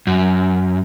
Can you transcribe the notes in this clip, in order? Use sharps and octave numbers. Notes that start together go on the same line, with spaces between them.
F#2